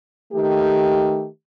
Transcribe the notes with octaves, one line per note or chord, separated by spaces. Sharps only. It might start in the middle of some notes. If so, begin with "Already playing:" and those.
D#3 A3 G4